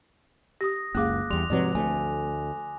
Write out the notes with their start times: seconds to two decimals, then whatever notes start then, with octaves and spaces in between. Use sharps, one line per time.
0.61 G4 D#6 A#6
0.95 F#1 C#2 A#3 G#4 F5 D6 F#6
1.30 E2 G3 C6 F7
1.50 G#2 C3 F3 F#3 C4 B4
1.75 D2 A3 G#5